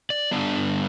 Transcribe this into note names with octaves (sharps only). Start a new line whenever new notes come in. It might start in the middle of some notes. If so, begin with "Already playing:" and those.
D5
G2 D3 G3 B3 D4 D5